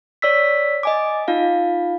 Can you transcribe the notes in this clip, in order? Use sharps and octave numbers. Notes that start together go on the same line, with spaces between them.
C#5 D5 E6 B6
D#5 G#5 D6
D#4 F4 F5